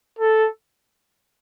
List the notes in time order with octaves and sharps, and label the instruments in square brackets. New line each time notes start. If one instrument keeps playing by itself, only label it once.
[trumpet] A4